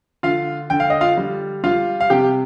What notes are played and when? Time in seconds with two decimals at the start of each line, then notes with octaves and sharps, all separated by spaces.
0.23 D3 F4 F5
0.70 D3 G5
0.80 F5
0.90 D#5
1.01 F4 F5
1.17 G3
1.63 G3 F4 F5
2.00 F5
2.10 C3 G4 G5